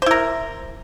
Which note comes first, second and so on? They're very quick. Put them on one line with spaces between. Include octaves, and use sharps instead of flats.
C5 E4 A#4